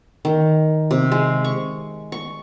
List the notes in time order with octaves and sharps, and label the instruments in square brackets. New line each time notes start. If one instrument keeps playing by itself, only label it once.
[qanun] D#3
C3
G#3
C#6
C#6